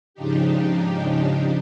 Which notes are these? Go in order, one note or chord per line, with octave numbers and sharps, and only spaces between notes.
G#2 C#3 F3 D4 D#4 G4